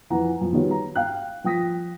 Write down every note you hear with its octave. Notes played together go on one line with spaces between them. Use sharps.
F2 E3 F#5 A#5
F2
D#3 G3 B3 F4 F#4 C#5
A#5
F5 G5 F#6
F3 G5 D#6 A#6 B6